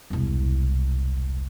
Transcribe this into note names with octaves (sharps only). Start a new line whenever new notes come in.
E1 C2